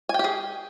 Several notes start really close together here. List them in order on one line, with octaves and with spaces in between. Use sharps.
G#5 G5 G4 G#4